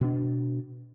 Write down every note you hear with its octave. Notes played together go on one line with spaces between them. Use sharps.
B2 D4